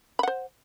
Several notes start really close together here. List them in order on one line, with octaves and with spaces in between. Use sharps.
B5 F#5 C5